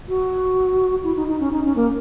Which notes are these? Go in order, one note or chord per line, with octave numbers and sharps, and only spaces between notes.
F#4
E4
D#4
D#4
C#4
D#4
C#4
A#3